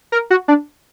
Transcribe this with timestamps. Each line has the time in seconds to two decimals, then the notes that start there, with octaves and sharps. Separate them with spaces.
0.12 A#4
0.30 F#4
0.48 D4